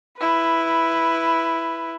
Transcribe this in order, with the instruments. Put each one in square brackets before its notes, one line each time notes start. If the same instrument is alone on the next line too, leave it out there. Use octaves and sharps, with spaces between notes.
[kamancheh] E4 B4